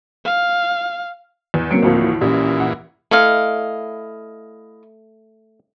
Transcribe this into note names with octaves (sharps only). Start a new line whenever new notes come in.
F5
E2
F#3 A#3 C4 C#7 D7
D2 A2 F3
E3
A#1 A#2 E3 C#4 G4
F#5
A3 E4 D#5 F5